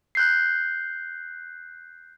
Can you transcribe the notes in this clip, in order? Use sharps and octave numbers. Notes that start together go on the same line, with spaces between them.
F#6 G6 C7